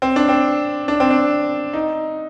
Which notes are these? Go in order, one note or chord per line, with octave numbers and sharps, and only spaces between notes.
C4
D4
C4
D4
C4
D4
D#4